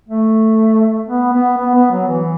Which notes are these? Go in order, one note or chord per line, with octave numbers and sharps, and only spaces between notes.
A3
B3
B3
B3
B3
F#3
E3